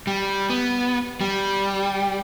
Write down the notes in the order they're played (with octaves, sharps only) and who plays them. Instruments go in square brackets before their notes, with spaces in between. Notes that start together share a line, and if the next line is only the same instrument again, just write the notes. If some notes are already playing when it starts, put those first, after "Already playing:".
[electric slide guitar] G3
B3
G3